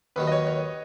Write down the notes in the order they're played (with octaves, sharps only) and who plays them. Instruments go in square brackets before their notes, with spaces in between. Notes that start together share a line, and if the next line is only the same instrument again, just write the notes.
[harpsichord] D#2 D#3 F#3 [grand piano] B4
[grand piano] D#5
C#5
C#5